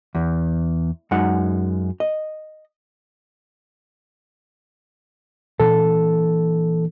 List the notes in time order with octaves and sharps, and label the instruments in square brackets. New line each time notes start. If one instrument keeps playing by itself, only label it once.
[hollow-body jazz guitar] E2
F#2 G#3 D#4 F#5
D#5
[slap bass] A#2 E3 D4 [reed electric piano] A4